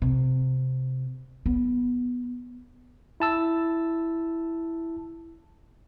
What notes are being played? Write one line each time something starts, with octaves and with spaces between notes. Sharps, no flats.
C3
B3
E4 A5 E6